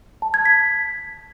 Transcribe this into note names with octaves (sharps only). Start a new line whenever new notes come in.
A5
G#6
B6